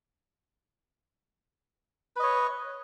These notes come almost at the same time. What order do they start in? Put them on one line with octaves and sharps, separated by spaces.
B4 D#5 C#5